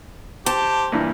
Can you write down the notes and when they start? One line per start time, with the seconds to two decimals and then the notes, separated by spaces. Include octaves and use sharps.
0.46 G4 C5 A5
0.92 G2 A#2 E3